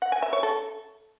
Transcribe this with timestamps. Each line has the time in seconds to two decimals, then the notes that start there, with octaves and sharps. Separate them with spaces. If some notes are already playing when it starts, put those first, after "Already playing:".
0.02 F#5
0.12 G#5
0.22 E5
0.33 C#5
0.43 A4